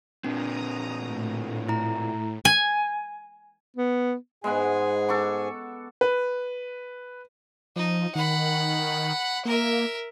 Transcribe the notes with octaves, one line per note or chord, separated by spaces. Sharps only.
A#2 C4 D4 A#5 D#6
A2
E4 A#5
G#5
B3
G#2 G#3 B3 G#4 F#5 G#5
A4 C#6 D6
B4
F3 D#4
D#3 F#5 B5
A#3 A#4 E5